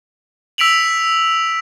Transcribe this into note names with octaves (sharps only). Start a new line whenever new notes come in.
E6 B6 D7 F7 F#7